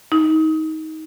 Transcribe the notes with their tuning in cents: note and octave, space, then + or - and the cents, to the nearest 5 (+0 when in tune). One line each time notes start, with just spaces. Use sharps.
D#4 +20